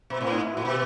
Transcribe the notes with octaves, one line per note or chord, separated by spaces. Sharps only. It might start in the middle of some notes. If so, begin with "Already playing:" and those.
B2
A2 C4
D#4
E4
A2 F#4
B2 G4